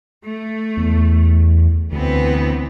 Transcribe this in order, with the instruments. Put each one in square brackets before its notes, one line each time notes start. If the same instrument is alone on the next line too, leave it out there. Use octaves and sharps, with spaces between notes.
[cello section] A3
[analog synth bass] E2
[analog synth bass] D2 [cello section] E3 B3 C4